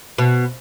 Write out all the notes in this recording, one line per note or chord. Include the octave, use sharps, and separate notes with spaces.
B2